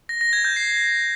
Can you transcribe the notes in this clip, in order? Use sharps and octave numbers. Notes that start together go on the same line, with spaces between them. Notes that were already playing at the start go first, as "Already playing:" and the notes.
A#6
A#6
G#6
G6
C7